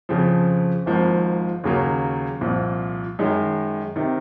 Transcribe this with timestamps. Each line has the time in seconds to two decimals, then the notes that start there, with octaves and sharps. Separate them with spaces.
0.09 F2 C#3 F3
0.86 G#1 G#2 F3 A#3
1.64 D#2 C#3 F#3 A#3
2.41 C2 A#2 F3
3.19 F#2 D#3 G#3
3.96 C3 D#3